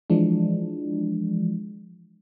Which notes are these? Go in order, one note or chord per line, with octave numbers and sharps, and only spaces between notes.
E3 F3 G#3 D4